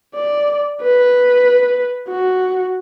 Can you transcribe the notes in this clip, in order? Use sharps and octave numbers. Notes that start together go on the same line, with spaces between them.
D5
B4
F#4